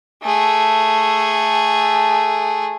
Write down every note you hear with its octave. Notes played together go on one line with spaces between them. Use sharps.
A3 G#4